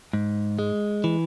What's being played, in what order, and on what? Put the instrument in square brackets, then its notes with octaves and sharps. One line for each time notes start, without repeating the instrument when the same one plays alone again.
[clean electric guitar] G#2
G#3
E3